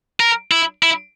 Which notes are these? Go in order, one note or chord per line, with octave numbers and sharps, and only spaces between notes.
A#4
E4
E4